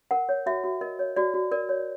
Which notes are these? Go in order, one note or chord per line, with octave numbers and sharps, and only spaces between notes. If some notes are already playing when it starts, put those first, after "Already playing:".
A#4 F#5
C#5
F#4 E5
F#4
A#4 D#5
C#5
F#4 D5
F#4
A#4 D5
C#5